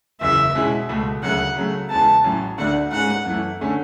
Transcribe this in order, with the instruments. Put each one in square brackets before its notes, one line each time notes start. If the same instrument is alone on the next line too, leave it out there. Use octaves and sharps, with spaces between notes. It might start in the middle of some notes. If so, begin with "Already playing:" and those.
[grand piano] F#1 E2 C#3 [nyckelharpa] E5
[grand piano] B2 G#3 C#4 E4
C#2 B2 A3
[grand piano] D2 C#3 F#3 [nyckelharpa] F#5
[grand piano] C#3 F#3 A3
[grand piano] E2 C#3 G#3 B3 [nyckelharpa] A5
[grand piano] A1 A2 F#3 C#4
[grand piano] D2 D3 A3 D4 F#4 [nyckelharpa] F#5
[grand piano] G#2 G#3 C#4 [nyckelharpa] F#5
[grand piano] F#2 E3 A3
D3 A3 C#4